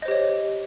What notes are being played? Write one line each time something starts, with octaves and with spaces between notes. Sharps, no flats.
G4 C5 C#5 D#5